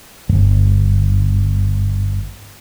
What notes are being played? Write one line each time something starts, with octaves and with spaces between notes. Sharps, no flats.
D1 G1